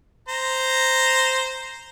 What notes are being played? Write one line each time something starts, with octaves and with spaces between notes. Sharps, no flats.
C5 A#5